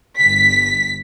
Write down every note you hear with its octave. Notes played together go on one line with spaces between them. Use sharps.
G1 B6